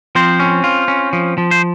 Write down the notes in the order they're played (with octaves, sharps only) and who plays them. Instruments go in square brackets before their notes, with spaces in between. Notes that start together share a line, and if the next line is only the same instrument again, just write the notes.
[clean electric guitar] F3 C4 C5
C#4
F4
C#4
F3
F3
C5